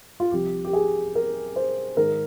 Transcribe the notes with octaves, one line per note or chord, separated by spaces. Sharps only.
F4
C2 C3 F3 G4
G4
G#4
A#4
C5
G#2 D#3 G#3 A#4